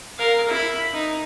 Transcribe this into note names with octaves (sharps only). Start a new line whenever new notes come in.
A#4 F5
E4 B5
D#4